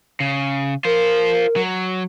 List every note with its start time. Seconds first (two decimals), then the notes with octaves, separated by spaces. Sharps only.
0.20 C#3
0.85 F4 A#4 C5
1.56 F#3